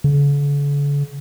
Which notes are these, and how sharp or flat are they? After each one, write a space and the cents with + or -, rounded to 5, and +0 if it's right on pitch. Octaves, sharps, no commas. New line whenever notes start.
D3 -45